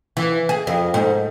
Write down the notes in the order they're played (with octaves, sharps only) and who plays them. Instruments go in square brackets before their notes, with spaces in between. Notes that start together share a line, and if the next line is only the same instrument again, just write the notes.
[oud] E3
G#4
F2
G#2